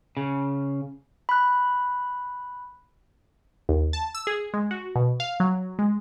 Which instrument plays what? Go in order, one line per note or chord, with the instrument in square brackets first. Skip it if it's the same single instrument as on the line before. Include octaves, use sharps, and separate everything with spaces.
[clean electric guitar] C#3
[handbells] B5 F#6
[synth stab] D#2
A5
E6
G#4
G#3
F#4
B2
F5
F#3
G#3